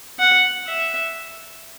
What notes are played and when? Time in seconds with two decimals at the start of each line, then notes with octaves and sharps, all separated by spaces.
0.19 F#5
0.67 E5